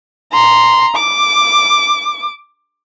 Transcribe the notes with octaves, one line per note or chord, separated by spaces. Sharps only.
A#5 C6
D6